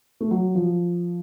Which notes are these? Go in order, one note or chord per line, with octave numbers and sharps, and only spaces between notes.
A3
F#3
F3